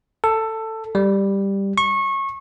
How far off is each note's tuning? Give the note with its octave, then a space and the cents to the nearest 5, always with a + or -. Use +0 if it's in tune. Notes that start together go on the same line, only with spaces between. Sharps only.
A4 +15
G3 +5
C#6 -25